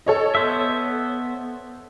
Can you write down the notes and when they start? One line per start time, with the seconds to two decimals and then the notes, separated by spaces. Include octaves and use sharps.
0.06 A4 C#5 D#5
0.35 B3 C5 E5